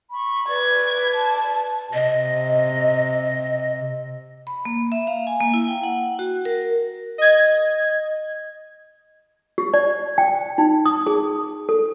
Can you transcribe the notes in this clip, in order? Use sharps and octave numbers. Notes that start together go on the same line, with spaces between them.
B5 C#6
B4 D5 D6 G#6
A5
C3 D#5
B5
A#3
E5
F5
G#5
A#3
E4
G5
F#5
F#4
A#4
D#5 G#6
G4
D5
G5
D#4
D#6
G#4
A4